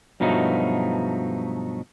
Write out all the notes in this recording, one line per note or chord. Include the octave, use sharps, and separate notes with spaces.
G2 B2 F3 F#3 A3 D#4